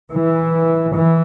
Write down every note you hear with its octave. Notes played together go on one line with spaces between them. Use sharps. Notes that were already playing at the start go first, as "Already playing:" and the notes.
E3
E3